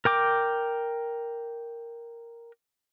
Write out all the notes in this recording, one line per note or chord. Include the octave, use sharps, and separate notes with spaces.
A#4 G5 D6